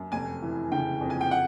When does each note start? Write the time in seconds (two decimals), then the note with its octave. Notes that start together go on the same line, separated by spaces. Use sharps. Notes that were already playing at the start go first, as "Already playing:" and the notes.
Already playing: F#2
0.12 F1 G#5
0.42 E3
0.71 C#3 G5
1.01 F2
1.10 G#5
1.21 G5
1.31 F#5